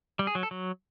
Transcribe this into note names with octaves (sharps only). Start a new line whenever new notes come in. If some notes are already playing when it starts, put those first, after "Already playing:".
G3
G#4
F#3
A4
F#3